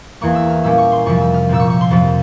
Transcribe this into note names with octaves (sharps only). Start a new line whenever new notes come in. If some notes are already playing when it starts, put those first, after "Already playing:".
E2 E3 A#3 C#6
E6
F6
A#2 G3 A#3 C#4 E6
C#6
C6
F2 C3 F3 C#6
E6
F6
A#2 F3 C4 E6
C#6
C#6
C6
F2 C3 F3